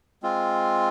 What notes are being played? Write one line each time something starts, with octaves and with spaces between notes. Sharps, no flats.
G#3 C4 F4